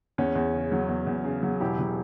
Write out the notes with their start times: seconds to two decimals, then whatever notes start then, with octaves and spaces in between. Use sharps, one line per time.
0.18 E2 C#4
0.35 E2
0.53 C#3
0.72 F#3
0.89 E2
1.07 E2
1.24 C#3
1.43 F#3
1.60 E1 E4 G4
1.79 F#3